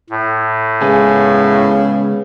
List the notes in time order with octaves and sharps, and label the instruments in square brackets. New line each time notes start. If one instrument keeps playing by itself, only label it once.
[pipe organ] A2
[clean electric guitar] C#2 B3 G#5 [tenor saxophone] C#3